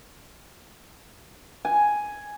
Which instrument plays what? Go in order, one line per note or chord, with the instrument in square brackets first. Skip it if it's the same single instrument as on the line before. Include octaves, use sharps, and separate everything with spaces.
[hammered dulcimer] G#5